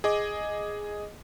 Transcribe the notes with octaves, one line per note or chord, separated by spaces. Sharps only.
G#4 D#5 D6